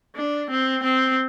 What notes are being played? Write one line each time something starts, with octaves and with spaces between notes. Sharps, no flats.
D4
C4
C4